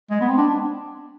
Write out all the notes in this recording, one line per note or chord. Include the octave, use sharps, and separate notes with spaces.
G#3
B3
C4
D4